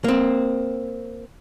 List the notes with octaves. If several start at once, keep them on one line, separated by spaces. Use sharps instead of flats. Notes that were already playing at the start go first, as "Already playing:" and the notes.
A#3 C4